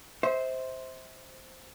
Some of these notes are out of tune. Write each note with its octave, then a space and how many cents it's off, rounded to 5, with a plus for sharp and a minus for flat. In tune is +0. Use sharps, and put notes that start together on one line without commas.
C5 +0 E5 -35